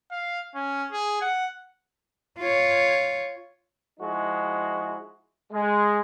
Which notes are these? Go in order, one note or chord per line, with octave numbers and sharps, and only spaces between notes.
F5
C#4
G#4
F#5
F4 C#5
F3 G#3 D#4 E4 F#4
G#3